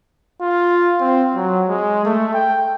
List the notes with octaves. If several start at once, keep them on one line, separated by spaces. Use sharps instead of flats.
F4
C4
F#3
G#3
A3
G5